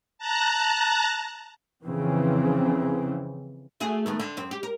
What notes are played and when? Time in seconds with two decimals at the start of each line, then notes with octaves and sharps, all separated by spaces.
0.18 A5 A#5 F#6
1.84 F2 C#3 E3 C4
3.80 A3 F#4 G#4
4.06 D#3 A3 B3
4.20 D3 C4
4.37 F#2 C4
4.51 G4
4.63 A#4